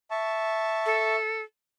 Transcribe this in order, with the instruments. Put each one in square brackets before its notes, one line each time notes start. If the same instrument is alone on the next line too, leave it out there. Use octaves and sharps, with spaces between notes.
[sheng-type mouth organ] E5 A5 C#6
[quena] A4